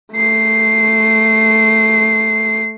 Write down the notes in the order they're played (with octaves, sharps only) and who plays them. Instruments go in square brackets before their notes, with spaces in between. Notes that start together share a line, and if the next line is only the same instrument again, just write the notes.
[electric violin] A3 C7